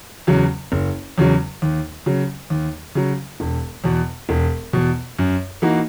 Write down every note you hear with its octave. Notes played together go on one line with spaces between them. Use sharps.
E2 C#3 F#3
F#1
E2 C#3 F#3
D#2
C#3 F#3
D#2
C#3 F#3
E1
E2 B2
E1
E2 B2
F#2
E3 A#3 D#4 F#4